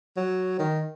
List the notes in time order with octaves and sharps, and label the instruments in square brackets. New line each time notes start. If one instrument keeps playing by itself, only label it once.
[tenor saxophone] F#3
D#3